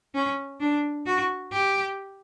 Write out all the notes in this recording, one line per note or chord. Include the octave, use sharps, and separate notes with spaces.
C#4
D4
F#4
G4